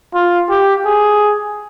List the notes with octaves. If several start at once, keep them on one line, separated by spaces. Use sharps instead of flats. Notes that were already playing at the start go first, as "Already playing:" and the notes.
F4
G4
G#4